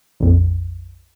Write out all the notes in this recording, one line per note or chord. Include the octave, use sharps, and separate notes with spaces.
A#1 F2